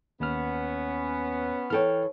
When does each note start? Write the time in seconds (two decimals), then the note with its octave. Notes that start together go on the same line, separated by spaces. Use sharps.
0.20 D#2 B3 C#4 F6
1.70 E3 A4 C#5 G5 F6